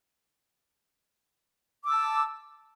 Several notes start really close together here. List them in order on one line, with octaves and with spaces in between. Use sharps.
D6 E6 A5